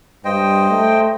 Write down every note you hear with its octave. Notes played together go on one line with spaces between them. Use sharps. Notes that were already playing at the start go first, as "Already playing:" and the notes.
G2 C5 D#5 G5
A3